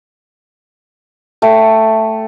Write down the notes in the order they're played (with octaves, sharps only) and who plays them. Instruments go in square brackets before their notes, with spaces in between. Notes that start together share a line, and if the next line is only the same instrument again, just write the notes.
[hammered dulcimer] A3 G5